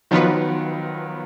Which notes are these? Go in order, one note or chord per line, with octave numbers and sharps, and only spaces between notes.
D#3 F3 F#3 B3 F4 B4